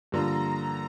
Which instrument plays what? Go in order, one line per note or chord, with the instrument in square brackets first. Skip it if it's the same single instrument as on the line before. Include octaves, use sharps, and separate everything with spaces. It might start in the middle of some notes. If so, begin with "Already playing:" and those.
[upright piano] G2 D3 F3 A#3 F4 [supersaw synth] A#5